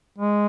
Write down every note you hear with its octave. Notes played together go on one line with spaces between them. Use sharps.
G#3